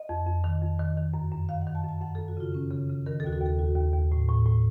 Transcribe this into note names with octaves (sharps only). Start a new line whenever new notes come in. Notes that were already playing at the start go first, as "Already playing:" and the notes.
Already playing: D#5
F2
F2
D#3
F2
D#3
D#3
F#2
F#2
D#3 F5
F#5
D#3
A5
F#2
A5
F#2 F#5
F#2 A4
F#4
C#3 F4
C#3 C#4
C#3
C#3
D#3 A#4
A4
D#2 F#4
A4
D#2
A4
D#2 F#4
D#2
D#2
A2
A2
A2